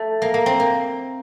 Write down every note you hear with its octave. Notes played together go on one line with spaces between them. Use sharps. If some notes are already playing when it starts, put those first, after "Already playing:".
Already playing: A3
A#3
A#3
C4
A#3